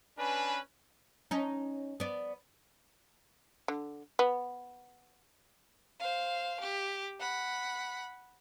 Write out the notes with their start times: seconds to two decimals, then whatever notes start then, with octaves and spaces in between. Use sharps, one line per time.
0.19 C#4 D4 B4 G#5
1.31 C#4 D#4
2.00 B3 D5
3.68 D3
4.19 B3
5.99 C5 F5
6.60 G4
7.20 F#5 B5